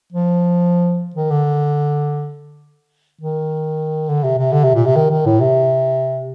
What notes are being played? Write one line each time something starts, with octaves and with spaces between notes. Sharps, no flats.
F3
D#3
D3
D#3
D3
C3
C3
D3
C3
A#2
C3
D#3
D#3
A2
C3